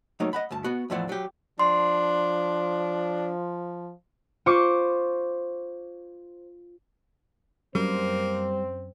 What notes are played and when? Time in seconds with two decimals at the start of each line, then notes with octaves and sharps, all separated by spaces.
0.20 F#3 A3 A#3 D#4 C#5
0.33 D#5 F#5 B5
0.51 D2 G2 A5
0.64 B3 F#4
0.90 E2 A2 F3 E4 D5 F#5
1.09 F#3 G4
1.59 F3 D4 C6
4.46 F4 C5 C#6 D6 C#7
7.75 F#2 G3 A#3 C4 C5